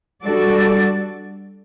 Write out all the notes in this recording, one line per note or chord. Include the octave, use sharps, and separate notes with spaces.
G3 D4 F#4 A4 D5